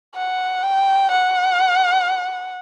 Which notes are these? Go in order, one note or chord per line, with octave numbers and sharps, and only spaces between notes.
F#5
G5
F#5